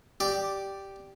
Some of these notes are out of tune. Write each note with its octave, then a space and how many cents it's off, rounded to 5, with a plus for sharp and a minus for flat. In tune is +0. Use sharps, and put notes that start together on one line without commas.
G4 -5 D5 +0